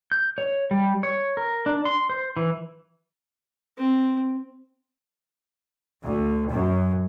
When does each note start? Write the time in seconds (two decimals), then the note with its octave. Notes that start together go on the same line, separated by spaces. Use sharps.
0.12 G6
0.38 C#5
0.71 G3
1.03 C#5
1.37 A#4
1.66 D4
1.85 C6
2.10 C5
2.37 E3
3.78 C4
6.04 D2
6.50 F#2